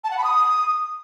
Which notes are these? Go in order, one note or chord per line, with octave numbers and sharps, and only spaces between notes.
A5
F#5
B5
D#6